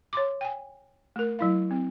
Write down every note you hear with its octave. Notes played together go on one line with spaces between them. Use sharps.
C#5 C6 D6
G5 G#5
A3 A#4
F#3 E4 F5
C4